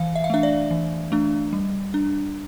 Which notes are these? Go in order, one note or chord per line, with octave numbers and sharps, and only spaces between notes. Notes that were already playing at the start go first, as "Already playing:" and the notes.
Already playing: E3 F5
E5
F5
A3 D4 E5
D5
E3
A3 D4
G3
D4